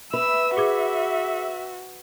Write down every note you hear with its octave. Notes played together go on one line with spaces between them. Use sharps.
B4 E5 B5 E6
F#4 G#4 D6 G#6